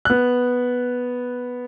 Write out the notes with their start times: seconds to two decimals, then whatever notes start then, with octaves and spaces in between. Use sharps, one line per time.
0.05 B3 F#6